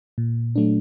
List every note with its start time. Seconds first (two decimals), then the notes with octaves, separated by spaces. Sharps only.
0.18 A#2
0.56 F#3 A3 D4